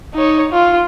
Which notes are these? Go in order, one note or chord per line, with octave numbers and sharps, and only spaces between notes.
D#4 C#5
F4